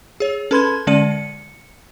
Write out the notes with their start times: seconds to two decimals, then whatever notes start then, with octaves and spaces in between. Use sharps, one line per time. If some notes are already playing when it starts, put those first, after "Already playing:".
0.20 G#4 C#5
0.51 C#4 A4 B4 B5 C6 G#6
0.87 D3 G#3 C#4 D5 C#7 D#7
1.11 C#7